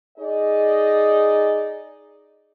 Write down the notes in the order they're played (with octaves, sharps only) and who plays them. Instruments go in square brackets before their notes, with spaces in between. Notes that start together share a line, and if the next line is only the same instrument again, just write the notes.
[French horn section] D#4 G#4 D5 D#5